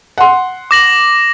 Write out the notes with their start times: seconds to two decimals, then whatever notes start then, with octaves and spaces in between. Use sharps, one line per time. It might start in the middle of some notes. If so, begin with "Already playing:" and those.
0.18 F#5 C6
0.71 D6 A#6 F#7